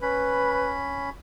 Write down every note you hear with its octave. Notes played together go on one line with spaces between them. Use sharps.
C#4 B4 B5